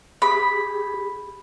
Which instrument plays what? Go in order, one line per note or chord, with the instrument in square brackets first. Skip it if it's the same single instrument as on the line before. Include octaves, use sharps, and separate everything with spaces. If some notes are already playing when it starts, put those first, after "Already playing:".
[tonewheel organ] G4 G#4 [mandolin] B5